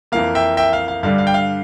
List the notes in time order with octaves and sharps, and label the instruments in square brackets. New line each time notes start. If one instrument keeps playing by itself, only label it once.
[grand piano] F2 E3 A#3 F5
E5 G5
E5 G5
F5
F5
G2 D3 G3 F5
F5
G5
F5